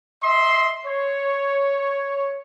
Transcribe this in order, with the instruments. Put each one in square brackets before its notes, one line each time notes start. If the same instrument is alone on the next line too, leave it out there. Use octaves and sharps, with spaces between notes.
[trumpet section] D#5 E5 C6
C#5